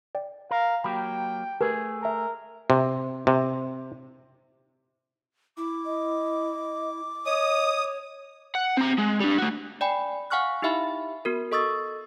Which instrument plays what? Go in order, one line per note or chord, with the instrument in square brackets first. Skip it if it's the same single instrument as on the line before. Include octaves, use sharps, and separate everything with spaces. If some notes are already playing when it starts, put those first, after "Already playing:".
[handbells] D5 G5
[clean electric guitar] A#4 [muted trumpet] F5
[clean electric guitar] F#3 A#3 G4 [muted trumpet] G5 [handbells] B5
[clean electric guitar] A3 G#4 [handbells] G4 A#4 B4
[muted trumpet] A#4 [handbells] E5 A5
[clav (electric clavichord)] C3
C3
[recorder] E4 [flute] D6
[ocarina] D#5
[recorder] C#5 [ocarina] D#5 [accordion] D#6
[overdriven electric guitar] F#5
C4 A#5
G#3
G3 D4
A3 F#4
[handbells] D5 G5 G#5 B5
F5 F#5 G#5 C#6 F6 F#6
D#4 E4 G4 E5 F5 B5
B3 F#4 A#4
A4 D#5 C#6 D#6 E6 A6